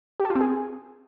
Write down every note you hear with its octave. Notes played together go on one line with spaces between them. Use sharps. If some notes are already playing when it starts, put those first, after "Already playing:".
G4
A4
F4
C4
G#4